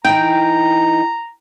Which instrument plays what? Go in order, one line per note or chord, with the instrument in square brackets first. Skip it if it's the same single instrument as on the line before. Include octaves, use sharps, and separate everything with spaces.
[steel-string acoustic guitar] E3 D#4 [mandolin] G5 [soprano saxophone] A#5